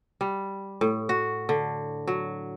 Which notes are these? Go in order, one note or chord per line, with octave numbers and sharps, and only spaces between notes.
G3
A2
F#4
D3
F#3